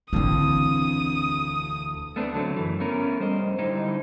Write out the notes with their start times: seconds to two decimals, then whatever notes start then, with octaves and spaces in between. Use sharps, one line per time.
0.13 E1 D2 D3 C4 E4 D#6
2.16 A3 B3 C4 D4
2.34 D3 F#3 A3
2.56 F#2 E3
2.80 A3 B3 C#4 A#4
3.20 G3 C5 D#5
3.59 D3 G3 D#4 E4 C5